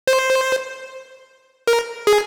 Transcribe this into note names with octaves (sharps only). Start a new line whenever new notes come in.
C5
A#4
G#4